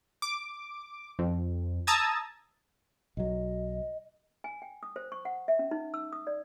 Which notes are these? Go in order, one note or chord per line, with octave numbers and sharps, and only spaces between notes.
D6
F2
A5 A#5 D#6 E6 G#6 A6
B1 F#3 D#5
G#5
G5
D#6
C5
C#6
F#5
E5
C#4
D#4
E6
D#6
D5